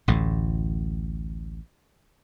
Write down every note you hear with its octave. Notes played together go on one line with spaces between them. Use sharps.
A1 D2 A2